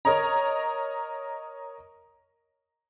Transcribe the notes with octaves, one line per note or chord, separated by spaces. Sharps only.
A#4 C#5 D#5 A#5